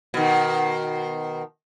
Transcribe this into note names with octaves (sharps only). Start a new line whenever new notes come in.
B2 D#3